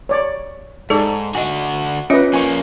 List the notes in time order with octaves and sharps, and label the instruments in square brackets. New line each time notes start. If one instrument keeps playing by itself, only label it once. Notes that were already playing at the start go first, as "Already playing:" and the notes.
[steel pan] C#5 D5
[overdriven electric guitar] G#2 [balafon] D#4 G#4 [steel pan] A4 D5
[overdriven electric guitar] D3 F#4 [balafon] D#5 G#5
[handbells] C#4 [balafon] F4 C#5 E5 [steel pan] B4 D#5
[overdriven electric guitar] F3 A#3 [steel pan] G#5 C#6